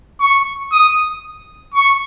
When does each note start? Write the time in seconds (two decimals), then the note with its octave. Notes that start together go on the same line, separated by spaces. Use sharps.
0.21 C#6
0.72 D#6
1.75 C#6